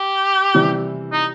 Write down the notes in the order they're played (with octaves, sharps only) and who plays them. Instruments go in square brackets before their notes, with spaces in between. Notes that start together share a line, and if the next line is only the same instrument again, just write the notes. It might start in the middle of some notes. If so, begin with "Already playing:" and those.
Already playing: [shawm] G4
[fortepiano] C3 E3 G3
[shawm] D#4